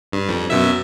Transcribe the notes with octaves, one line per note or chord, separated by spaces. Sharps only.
G2
F2
F#2 B2 E5